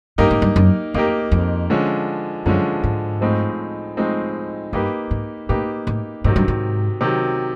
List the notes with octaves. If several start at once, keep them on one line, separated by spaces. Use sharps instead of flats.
G2 A#3 D#4 G4 A#4
G#2
G2
F#2
F2 A#3 D#4 G4 A#4
F2
D3 F3 G#3 C#4
F#2 D3 F3 G#3 C#4
G#2
A2 F3 G#3 C4 D#4
A2 F3 G#3 C4 D#4
G2 A#3 D#4 G4 B4
G#2
A2 A#3 D#4 G4 B4
A2
G#2 C3 D#3 F#3
G2
G#2
C3 D#3 F#3